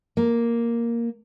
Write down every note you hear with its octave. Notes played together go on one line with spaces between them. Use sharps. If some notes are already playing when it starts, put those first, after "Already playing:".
A#3